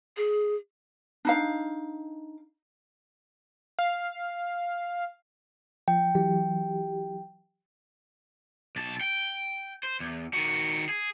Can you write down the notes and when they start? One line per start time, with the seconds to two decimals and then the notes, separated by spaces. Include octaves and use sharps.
0.17 G#4
1.25 D4 D#4 F5
3.79 F5
5.88 F3 G5
6.15 E3 F#3 G4
8.76 B1 A5
9.01 G5
9.83 C5
10.00 E2
10.33 D#3 F#4
10.89 G#4